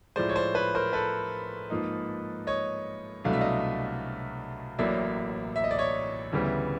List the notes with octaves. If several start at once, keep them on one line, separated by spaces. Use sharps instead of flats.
A2 F3 G#3 C5 D5
C#5
C5 D5
B4 C#5
A#4 C5
A4 B4
G#2 F3 A#3 D#4
C#5 D#5
C2 B2 F#3 A3 D4 F5
E5
D#5 F5
A1 A2 F#3 A#3 D5 E5
E5
D#5
D5
C#5 D#5
D2 C#3 E3 G3 B3